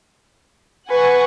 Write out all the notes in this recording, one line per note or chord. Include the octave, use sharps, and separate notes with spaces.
B4 F#5 G#5 C#6